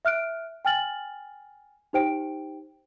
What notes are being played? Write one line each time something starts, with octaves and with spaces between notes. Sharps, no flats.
E5 F6 F#6 D7
G5 G#5 F6 A6 F#7
D#4 G4 C5 G5 D7